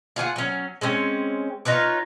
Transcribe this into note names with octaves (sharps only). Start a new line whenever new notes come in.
F4 G#4 C#5 F#5
F#3 C#4
G#3 C4 C#4
D#4 F4 B4 C#5